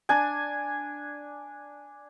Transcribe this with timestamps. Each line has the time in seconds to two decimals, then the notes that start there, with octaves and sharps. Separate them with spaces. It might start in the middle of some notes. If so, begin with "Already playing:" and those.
0.09 D4 G#5